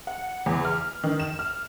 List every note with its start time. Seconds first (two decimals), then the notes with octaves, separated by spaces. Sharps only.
0.07 F#5
0.46 E2
0.65 F6
1.04 D#3
1.20 E7
1.39 F6